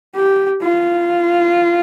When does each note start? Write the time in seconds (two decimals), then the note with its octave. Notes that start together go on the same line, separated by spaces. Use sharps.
0.16 G4
0.62 F4